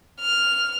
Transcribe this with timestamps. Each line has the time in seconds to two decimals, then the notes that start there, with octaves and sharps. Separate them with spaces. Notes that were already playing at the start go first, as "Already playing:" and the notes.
0.20 F6